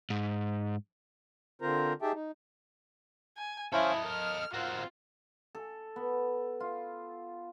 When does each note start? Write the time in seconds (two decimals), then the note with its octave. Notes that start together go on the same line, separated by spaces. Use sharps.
0.10 G#2
1.62 D3 C4 F4 A#4 C5 A#5
2.02 D#4 G4 G#4 E5 G5 A5
2.14 D#4
3.37 G#5
3.73 C#4 E4 A4 C5 D#5 F5
4.05 A#4 F6
4.54 C4 F4 F#4 A#4
5.55 A4
5.96 B3
6.60 F4